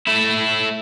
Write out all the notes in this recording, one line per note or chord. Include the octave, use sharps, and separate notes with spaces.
A3 E4